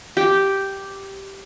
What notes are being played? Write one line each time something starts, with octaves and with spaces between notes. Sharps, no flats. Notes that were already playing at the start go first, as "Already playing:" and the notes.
G4